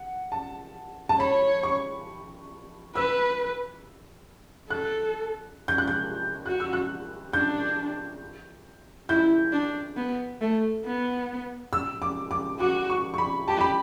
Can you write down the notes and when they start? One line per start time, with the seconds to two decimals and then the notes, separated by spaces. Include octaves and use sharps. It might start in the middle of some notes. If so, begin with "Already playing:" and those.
Already playing: F#5
0.32 A5
1.09 A5
1.19 C#5 B5
1.63 C#6
2.95 B4 E6
4.70 A4 F#6
5.68 G6
5.78 F#6
5.88 G6
6.46 F#4 F#6
6.60 E6
6.73 F#6
7.33 D4 G6
9.09 E4 G6
9.52 D4
9.97 B3
10.41 A3
10.85 B3
11.73 E6
12.02 D6
12.31 D6
12.60 F#4 D6
12.90 C#6
13.14 C#6
13.18 B5
13.48 G4 A5
13.61 B5